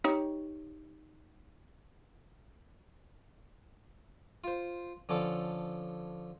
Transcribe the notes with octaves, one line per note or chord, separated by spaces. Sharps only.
D#4 G4 C#5
F4 C5
D3 F3 C#4 A4 D6